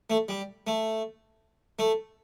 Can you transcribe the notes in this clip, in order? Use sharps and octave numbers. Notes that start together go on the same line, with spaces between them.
A3
G3
A3
A3